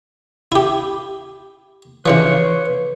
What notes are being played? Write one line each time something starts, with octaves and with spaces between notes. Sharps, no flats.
E4 G4
C#3 E3 F3 B4 C#5